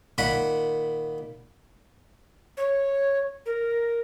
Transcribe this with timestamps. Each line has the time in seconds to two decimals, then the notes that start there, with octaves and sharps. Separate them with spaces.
0.18 A#2 D#3 F#5 B5
2.57 C#5
3.46 A#4